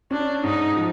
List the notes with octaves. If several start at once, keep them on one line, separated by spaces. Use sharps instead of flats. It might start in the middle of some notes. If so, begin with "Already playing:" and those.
C#4 D4
G#2 D#4
F3